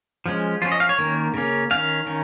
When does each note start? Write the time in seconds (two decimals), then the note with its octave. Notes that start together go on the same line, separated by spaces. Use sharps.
0.26 F3 G#3 C#4
0.62 F3 C#4 F4
0.72 D#5
0.80 F5
0.89 C#5
0.98 D#3 A#3 C#4
1.34 C#3 A#3 C#4
1.71 D#3 C#4 F5
2.06 D#3 C#4